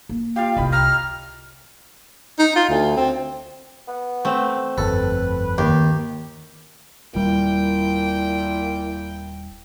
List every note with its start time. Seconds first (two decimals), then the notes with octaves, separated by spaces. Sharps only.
0.09 A#3
0.36 F4 G4 F5
0.57 C2 E4 D#5 B5
0.72 A#5 F6
2.39 D#4
2.56 F4
2.69 D2
2.97 C4
3.88 B3
4.25 A3 C4
4.78 G1 F2 A4 B4
5.58 D#2 G4
7.15 D#1 A#2 G3 E4 G5